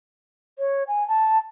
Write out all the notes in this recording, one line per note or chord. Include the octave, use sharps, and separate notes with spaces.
C#5
G#5
A5